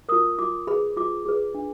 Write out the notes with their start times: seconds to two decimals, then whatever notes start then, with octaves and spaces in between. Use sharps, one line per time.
0.09 F4 A#4 D#6
0.39 F4 D6
0.67 G#4 B4 B5
0.97 F4 D6
1.25 G#4 B4
1.54 D4